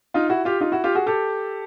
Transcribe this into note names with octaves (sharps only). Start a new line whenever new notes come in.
D#4 F4
E4 F#4
F4 G4
D#4 F4
E4 F#4
F4 G4
F#4 G#4
G4 A4